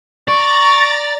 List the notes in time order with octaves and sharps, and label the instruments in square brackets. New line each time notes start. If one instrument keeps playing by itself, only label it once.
[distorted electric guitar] D5 [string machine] A#5 A6 [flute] C#6